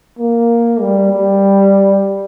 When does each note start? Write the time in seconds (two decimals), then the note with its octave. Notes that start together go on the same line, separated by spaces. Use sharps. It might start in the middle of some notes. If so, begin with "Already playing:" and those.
0.19 A#3
0.81 G3
1.12 G3